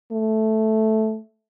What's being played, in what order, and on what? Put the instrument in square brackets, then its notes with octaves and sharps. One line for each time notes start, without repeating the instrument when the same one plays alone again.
[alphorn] A3